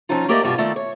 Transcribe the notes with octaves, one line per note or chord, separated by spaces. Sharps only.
F3 C4 C#4 D#4 F4
A3 A#3 G4 A#4 D5 D#5
G2 B2 G3 F4
D#3 A3 C4 F4 D5
C#5